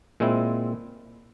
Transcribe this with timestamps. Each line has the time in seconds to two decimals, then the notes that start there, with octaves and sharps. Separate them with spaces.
0.20 A#2 G#3 C4 E4